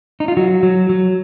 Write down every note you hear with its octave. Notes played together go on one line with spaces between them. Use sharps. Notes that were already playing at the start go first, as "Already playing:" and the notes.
D#4
F4
F#3 F#4
F#3
F#3